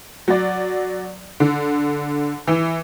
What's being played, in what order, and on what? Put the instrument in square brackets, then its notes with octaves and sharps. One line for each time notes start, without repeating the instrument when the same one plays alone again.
[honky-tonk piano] F#3 D5
D3
E3